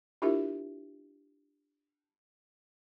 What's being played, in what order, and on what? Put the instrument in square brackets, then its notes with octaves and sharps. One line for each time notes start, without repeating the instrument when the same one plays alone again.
[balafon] D4 E4 F4 G4 A#4 E5